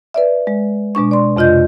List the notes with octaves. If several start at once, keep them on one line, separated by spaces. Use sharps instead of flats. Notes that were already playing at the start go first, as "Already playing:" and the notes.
B4 D5 E5
G#3
B2 G#3 D4 C#6
D5 C6
F2 C3 F4 D#5 G6